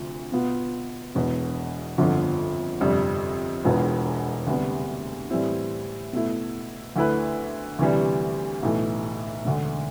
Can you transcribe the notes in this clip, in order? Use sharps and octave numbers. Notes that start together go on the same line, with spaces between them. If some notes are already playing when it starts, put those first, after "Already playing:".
Already playing: D2 C3 F3
B2 B3 F4
E1 E2 B2
G1 F2 D3 F3 B3
G1 F2 C3 G3
E1 E2 B2 B3 F4
D2 C3 G3 B3
A2 E3 G3 C4 E4
B2 A3 E4
D2 D3 A3 E4 B4
D2 C3 E3 G3
B1 A2 E3 A3
E1 D2 D3